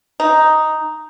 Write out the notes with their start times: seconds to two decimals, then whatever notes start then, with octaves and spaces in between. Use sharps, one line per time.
0.20 D#4